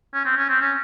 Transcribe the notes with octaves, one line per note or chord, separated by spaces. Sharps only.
C#4
C4
C#4
C4
C#4